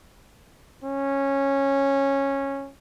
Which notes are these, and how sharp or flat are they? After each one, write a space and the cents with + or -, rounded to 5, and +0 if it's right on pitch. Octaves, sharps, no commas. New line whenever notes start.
C#4 -10